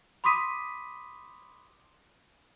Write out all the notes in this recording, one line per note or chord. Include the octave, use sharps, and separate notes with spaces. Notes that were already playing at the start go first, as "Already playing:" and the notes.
B5 C6 D6 D#6 B6 D#7